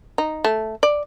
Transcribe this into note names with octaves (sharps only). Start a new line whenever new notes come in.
D#4
A3
D5